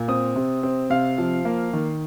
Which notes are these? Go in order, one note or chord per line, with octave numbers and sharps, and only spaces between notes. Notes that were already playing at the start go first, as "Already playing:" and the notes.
Already playing: A#2
C4 D#6
C3
C4
C3 F5
F3
A#3
D#3